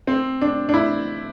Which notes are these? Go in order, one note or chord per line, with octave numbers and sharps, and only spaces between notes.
C4
D4
D4
E4